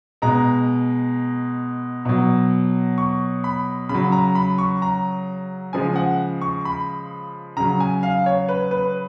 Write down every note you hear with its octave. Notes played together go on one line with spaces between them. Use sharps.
B2 G#3 A#5
B2 F#3
C#6
B5
C#3 B5
F#3
A#5
B5
C#6
A#5
C#3 F3 G#3 G#5
F#5
C#6
B5
C#3 F#3 A#5
G#5
F5
C#5
B4
B4